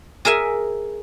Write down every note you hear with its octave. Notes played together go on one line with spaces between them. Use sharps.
G#4 A#4 E5 G#5